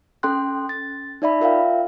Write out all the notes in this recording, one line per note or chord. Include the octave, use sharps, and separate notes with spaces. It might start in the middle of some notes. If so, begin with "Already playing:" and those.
C#4 A4 G5 C6 F#6
A6
D#4 D5 E5 B5
F4 A#4 E5 F5 G5